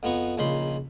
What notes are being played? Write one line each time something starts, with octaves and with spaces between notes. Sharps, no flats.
F2 F3 B3 A#5 C#6
A#1 C#3 D#4 F4 B5 C6